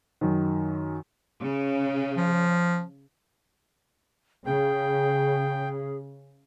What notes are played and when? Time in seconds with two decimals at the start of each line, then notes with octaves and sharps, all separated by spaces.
0.21 F#2 D#3
1.42 C#3
2.17 F3
4.46 C#3 G#4 G5